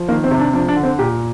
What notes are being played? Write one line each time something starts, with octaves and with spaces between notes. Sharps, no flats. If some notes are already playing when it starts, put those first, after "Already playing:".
Already playing: F3
D#3 A#3
C4
C3
D4
F3 D4
D4
D3
C4
A#2 G4